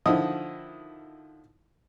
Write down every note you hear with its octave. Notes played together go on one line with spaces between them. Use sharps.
D3 D#3 F3 E4 D#5 D#6